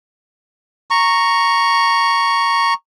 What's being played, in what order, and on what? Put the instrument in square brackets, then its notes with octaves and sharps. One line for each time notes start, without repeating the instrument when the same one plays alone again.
[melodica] A#5 C#6